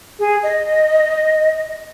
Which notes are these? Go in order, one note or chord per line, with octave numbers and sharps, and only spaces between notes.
G#4
D#5